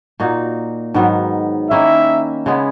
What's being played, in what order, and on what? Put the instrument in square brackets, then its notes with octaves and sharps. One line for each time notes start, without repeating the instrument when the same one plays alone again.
[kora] A#2 A#3 D#4 F#4
G#2 D#3 F#3 B3
[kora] D#3 A#3 C#4 E4 [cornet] E5
[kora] C#3 G#3 B3